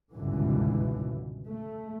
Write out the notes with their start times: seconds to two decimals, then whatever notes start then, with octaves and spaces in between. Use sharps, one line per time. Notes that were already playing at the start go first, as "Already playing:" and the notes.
0.12 G#1 C#2 G2 B2 D3 E3
1.47 A3